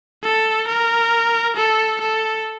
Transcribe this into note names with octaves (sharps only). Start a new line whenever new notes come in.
A4
A#4
A4
A4